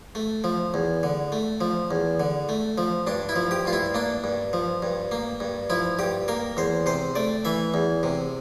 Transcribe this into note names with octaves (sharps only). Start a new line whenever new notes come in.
A3
F3
E2
D3
A3
F3
E2
D3
A3
F3
G2 D4
E4
F3
G4
G2 F4
E4
A#3 D4
G2
F3
G2
A#3
G2
F3 E4
G2 G4
A#3 A#4
E2 C5
C3 C5
A3 D5
E3 E5
E2
C3